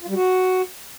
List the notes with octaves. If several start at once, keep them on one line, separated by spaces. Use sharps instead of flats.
F4
G3
F#4